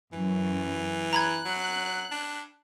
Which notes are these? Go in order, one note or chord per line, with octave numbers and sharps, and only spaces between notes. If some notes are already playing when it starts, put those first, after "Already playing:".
F#2 E3
A#5 B5 F#6 G#6
F#3
D4